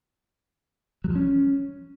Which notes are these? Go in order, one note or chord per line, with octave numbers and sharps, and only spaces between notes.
F#3
F3
C#4